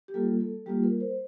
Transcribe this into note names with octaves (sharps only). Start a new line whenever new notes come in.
G4
G3 A#3 F4 A4
A4
G3 A#3 F4 G4
A#4
C5